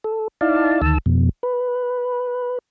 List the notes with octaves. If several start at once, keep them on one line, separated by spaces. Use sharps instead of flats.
A4
D#4 E4 D5 F5 A5
D2 D#3 A5 E6
F2 B2
B4